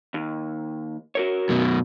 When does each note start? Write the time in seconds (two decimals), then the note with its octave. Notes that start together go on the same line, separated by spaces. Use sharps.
0.14 D#2
1.15 F#4 A#4 C#5
1.49 F#2 B2